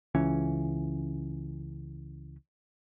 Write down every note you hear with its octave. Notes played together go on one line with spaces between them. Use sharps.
C#2 E3 C#4